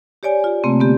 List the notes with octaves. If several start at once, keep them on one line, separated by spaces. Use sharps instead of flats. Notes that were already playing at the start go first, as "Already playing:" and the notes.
G4 C#5 D5 G#5
F4 G4
C3 A3 A#3 C4
D3 B3 G4